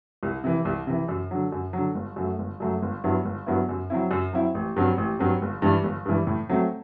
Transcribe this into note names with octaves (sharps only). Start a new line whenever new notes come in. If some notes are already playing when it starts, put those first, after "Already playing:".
C2
C3 E3
C2
C3 E3
F#2
D3 F#3
F#2
D3 F#3
G1
F#2 F#3 A3
G1
F#2 F#3 A3
G1
G2 F#3 B3 E4
G1
G2 F#3 B3 E4
F#2
F#3 C4 E4
F#2
F#3 C4 E4
A1
G2 F#3 C4
A1
G2 F#3 C4
G1
G2 E3 G3
G1
G2 E3 G3
A2
F#3 A3 C4